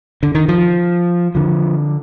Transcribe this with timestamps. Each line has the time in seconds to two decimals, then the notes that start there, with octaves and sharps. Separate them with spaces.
0.23 D3
0.35 D#3
0.48 F3
1.35 D3 F3